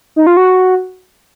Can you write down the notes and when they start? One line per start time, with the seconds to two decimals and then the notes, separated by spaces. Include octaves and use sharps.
0.16 D#4
0.27 F4
0.37 F#4